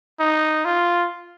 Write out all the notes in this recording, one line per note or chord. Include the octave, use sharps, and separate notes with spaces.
D#4
F4